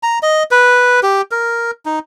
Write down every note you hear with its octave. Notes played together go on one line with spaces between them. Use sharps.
A#5
D#5
B4
G4
A#4
D#4